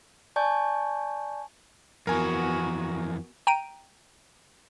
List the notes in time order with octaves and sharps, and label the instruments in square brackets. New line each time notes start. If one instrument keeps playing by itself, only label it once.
[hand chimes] D5 G#5 A5 C#6 G6
[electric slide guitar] F2 E3 [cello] B3 F#4 [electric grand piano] A#4 G#5
[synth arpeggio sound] G5 A#5 D7 D#7